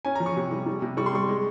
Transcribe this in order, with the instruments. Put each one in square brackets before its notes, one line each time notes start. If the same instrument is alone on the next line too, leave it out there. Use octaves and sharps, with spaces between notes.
[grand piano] C#4 G#5
A#5
F3
C#6
C3
G3
G3
C3
G3 C#6
C6
G3 C#6
G#3